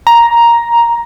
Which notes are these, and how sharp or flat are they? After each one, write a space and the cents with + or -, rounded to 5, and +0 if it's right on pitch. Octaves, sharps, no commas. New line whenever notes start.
A#5 +5